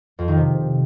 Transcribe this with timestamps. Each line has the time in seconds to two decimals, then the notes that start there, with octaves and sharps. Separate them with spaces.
0.19 F2
0.28 D#3
0.37 C3